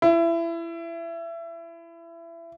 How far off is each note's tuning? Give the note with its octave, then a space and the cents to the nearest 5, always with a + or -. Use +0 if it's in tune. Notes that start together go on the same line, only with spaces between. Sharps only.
E4 +25